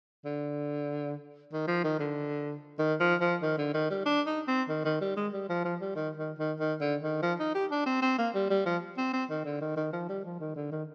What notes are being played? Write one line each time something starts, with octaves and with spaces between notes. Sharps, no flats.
D3
D#3
F3
D#3
D3
D#3
F3
F3
D#3
D3
D#3
G3
D4
D#4
C4
D#3
D#3
G3
G#3
G3
F3
F3
G3
D#3
D#3
D#3
D#3
D3
D#3
F3
D#4
G4
D4
C4
C4
A#3
G3
G3
F3
C4
C4
D#3
D3
D#3
D#3
F3
G3
F3
D#3
D3
D#3